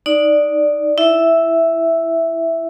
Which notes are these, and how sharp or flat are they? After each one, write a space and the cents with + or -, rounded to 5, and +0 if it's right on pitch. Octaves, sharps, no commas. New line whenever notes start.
D#4 +0 D5 +0
E4 +0 E5 +0